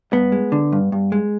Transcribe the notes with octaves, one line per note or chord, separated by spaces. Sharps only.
G2 B3
G#3
D3
G2
G2
G#3